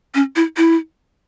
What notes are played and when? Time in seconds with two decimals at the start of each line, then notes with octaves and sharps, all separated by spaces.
0.15 C#4
0.36 E4
0.57 E4